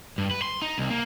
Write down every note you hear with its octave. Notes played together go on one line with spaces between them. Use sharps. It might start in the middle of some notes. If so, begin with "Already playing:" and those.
G2
B4
C6
D#4
C2
A#3